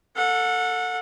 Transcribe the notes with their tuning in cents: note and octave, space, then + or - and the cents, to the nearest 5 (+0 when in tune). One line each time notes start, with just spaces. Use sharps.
A4 +20 F#5 -30